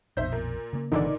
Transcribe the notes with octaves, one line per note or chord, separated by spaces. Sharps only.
A#1 F2 B2 D#4 C5 E5 G6
A#2
C#3 A#3
G#1 A#2 D3 E3 D#4 D5